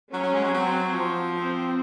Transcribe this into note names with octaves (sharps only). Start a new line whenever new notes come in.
F#3 C#4
F#3
G#3
F#3
F#3 C4
F3
C4